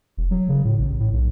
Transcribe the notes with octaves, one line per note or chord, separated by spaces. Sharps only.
E1
F#3
C#3
A2
A1
A2
B1